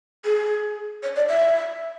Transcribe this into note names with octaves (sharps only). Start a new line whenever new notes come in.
G#4
C#5
D5
E5